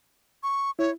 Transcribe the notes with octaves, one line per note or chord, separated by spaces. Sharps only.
C#6
E4 C#5